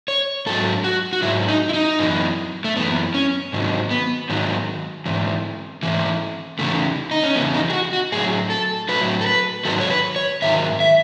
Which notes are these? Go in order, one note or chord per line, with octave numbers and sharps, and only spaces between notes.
C#5
G#2 F#3 A4
F#4
F#4
G#2 F#3 E4
D#4
E4
D#4
F#2 E3
A3
F#2 E3 B3
C#4
G#2 D#3 F#3
B3
G#2 D#3 F#3
G#2 E3
G#2 E3
E2 C#3 E3 A3
D#4
C#4
E2 C#3 E3 B3
D#4
G#4
F#4
F#4
A2 F#3 G#4
A4
A2 F#3 B4
A4
B4
G#2 D#3 F#3 A4
C#5
B4
C#5
G#2 D#3 F#3 E5
E5